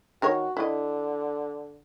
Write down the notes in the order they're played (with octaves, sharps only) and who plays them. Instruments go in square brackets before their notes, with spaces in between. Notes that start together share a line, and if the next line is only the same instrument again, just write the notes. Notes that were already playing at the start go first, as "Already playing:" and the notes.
[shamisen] D#3 A#4 C#5 [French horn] F#4
[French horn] D3 [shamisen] E4 D#5